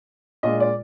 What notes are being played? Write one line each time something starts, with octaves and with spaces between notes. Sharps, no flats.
A#2 G#3 D4 F4 D#5
D5